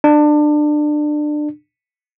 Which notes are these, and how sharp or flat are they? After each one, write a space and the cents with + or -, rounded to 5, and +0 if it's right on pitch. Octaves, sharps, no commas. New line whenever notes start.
D4 +25